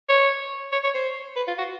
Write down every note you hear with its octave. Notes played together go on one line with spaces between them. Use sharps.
C#5
C#5
C#5
C5
B4
F4
F#4